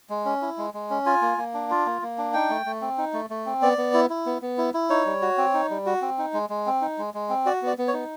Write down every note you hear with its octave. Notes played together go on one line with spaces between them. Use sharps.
G#3
C#4
E4
G#3
G#3
C#4
F4 G#5
A#3
A#3
D4
F4
A#3
A#3
D4
D#4 G5
A3
A3
C4
D#4
A3
A3
C4
B3 D5
B3
E4
E4
B3
B3
E4
E4
D#4 C#5
G3
F#4
C4
D#4
G3
F#4
C4
D#4
G#3
G#3
C4
D#4
G#3
G#3
C4
F#4 D5
B3 D5
B3
C#5
D#4